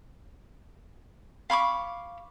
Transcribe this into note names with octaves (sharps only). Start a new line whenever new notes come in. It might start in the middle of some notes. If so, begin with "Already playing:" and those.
F5 B5 C#6 D6